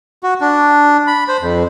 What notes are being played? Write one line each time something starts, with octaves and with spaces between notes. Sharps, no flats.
F#4
D4
B5
C5
F2